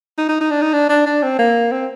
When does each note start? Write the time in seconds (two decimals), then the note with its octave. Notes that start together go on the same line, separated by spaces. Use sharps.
0.18 D#4
0.29 D#4
0.41 D#4
0.51 D4
0.62 D#4
0.73 D4
0.89 D4
1.06 D4
1.23 C4
1.39 A#3
1.72 C4